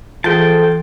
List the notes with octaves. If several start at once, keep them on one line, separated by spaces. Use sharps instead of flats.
E3 F3 A3 C4 F4 G#4 G5 A5